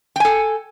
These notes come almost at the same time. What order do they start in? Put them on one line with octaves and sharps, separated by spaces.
G5 G#5 A4